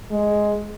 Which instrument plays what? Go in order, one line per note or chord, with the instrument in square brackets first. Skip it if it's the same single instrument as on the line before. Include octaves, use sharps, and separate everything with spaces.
[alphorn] G#3